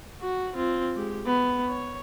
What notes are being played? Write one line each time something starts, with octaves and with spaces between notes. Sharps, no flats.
F#4
C4 F4
G#3 G4
B3
C#5